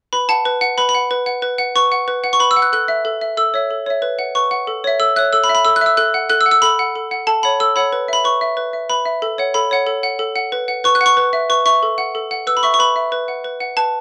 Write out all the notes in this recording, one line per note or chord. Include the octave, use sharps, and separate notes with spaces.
B4 B5
F#5 A5
B4
F#5
B4 B5
B5
F#5
B4
F#5
B4
F#5
B4 C#6
F#5
B4
F#5
C#6
B4 B5
E6
F#5
F#6
A4 F#6
E5
A4
E5
A4 E6
C#5 E5
A4
C#5 E5
B4
F#5
B4 C#6
F#5
A4
C#5 E5
A4 E6
C#5 E5 F#6
A4 E6
B5
E5
B5
A4 E6
F#6
E5 E6
A4 F#6
F#5
A4 F#6
E6
F#5
E6
A4 B5
F#5
A4
F#5
A4 A5
C#5 F#5 B5
A4 E6
C#5 F#5 B5
B4
E5 B5
B4 C#6
E5
B4
E5
B4 B5
E5
A4
C#5 F#5
A4 B5
C#5 F#5
A4
F#5
A4
F#5
B4
F#5
B4 C#6
F#6
F#5
C#6
B4
E5
B4 C#6
E5 C#6
A4
F#5
A4
F#5
B4 E6
B5
E5 C#6
C#6
B4 B5
E5
B4
F#5
B4
F#5
B4 A5